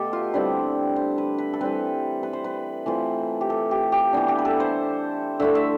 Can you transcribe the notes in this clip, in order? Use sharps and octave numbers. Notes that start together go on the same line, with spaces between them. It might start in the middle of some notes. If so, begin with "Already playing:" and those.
Already playing: B2 A3 G4 A4
F4
D3 G3 C4 E4 B4
C5
B4
B4
A4
E3 G3 C4 B4
B4
C5
B4
E3 A3 C4 F4
G4
A4
G4
G4
E3 B3 D4
G4
B4
A4
C5
D3 A3 E4 E5
E5